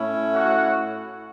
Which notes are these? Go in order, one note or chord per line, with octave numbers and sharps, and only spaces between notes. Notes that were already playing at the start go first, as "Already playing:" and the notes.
Already playing: A2 A3 C#4 E4
F#4 F#5